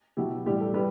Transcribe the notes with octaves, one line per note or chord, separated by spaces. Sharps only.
B2 F#3 E4 G4
A2 E3 G3 G4
A4
G3 G4 B4